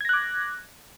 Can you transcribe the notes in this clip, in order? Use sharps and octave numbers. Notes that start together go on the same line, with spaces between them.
D6 F#6 G#6 A#6